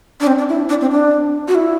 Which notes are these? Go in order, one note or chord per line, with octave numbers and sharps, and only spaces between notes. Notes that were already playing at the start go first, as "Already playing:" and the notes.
D4
C4
D4
E4
D4
C4
D4
F#4
E4